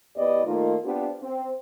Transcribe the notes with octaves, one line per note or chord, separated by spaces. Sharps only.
E2 B3 E4 G4 D5 D#5
D#3 A3 A#3 D#4 F4
B3 C4 D4 F4 G4
C4